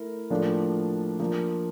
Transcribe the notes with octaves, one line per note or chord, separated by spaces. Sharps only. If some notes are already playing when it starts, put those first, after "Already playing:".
Already playing: A3 E4 A#4
A2 F3 A#3 D4 F4
F3 A#3 D4